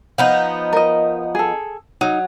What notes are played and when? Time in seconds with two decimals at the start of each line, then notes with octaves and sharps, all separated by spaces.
0.18 F3 B3 D#4
0.73 A#4 D#5
1.35 G#4 A4
2.01 F#3 D#4